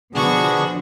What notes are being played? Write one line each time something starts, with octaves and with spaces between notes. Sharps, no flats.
B2 D3 F3 B3 D4 F#4 G#4 C#6